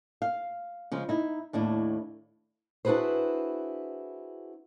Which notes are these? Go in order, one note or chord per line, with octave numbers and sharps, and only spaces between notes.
F5
C#3 F3 G#3
D#4 E4
D#2 A2 D4 E4
D4 E4 F#4 G#4 B4 C5